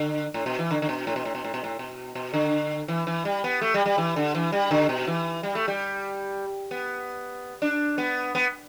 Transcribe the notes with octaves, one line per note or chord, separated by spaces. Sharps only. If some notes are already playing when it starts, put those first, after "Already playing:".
Already playing: D3
A2
B2
E3
D3
D3
B2
A2
B2
A2
B2
A2
B2
A2
B2
B2
D3
E3
E3
G3
B3
A3
G3
G3
E3
D3
E3
G3
D3
B2
E3
G3
A3
G3
B3
D4
B3
B3